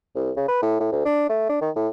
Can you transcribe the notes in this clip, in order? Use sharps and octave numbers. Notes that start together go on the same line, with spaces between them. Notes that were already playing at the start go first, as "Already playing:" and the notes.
C2
C#3
B4
A2
A2
D2
D4
A3
D4
D#3
A2